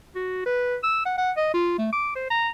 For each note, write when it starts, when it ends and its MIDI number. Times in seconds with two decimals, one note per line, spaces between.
0.16 0.45 66
0.46 0.76 71
0.83 1.01 88
1.06 1.17 78
1.18 1.32 78
1.37 1.52 75
1.54 1.74 65
1.78 1.87 57
1.93 2.14 86
2.16 2.28 72
2.30 2.49 82